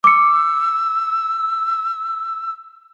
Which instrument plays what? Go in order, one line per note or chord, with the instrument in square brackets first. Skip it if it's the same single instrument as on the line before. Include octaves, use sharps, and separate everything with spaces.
[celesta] D6 C#7 [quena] E6